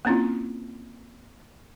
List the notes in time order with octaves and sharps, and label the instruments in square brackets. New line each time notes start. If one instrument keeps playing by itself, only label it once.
[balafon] A#3 C4 C#4 E4 F4